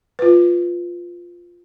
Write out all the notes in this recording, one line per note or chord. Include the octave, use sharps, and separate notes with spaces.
F4 B4